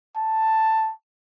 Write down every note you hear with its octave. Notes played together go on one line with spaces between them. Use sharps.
A5